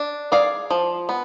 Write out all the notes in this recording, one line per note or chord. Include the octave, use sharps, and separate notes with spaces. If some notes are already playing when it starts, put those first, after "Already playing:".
Already playing: D4
G#4 D5 F5
F3
B3